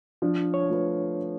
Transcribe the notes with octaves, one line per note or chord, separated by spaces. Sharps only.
F3 D4
C#5
A3 F4 B4